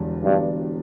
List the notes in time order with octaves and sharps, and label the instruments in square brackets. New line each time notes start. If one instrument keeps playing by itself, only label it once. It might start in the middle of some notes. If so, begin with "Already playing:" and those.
Already playing: [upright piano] E1 E2 D3 G3 D4
[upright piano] E1 E2 D3 G3 D4 [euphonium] G2